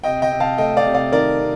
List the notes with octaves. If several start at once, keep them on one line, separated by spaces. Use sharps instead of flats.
C3 D#5 G5
D#5 G5
C3
F5 A5
A3 D#5 G5
D5 F5
C3
D5 F5
D#3 A#4 D5
C3